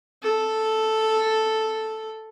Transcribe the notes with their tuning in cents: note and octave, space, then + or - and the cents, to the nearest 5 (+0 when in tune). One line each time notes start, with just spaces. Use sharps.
A4 +0